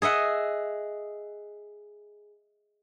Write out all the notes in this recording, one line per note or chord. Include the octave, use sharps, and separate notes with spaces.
G#4 D#5 E5 F#5